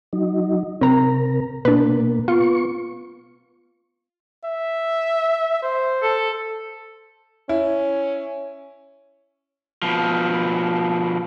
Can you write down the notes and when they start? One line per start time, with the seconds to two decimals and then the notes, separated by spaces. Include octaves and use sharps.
0.13 F#3 D#4
0.81 C3 C4 A#4 A#5
1.65 B2 A#3 D4 B4
2.28 B3 F4 C#6
4.45 E5
5.62 C5
6.02 A4
7.49 C#4 E4
9.82 B2 F3